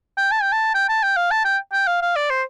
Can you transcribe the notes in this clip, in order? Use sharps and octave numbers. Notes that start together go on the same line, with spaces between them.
G5
A5
G5
A5
G5
A5
G5
F5
A5
G5
G5
F5
F5
D5
C5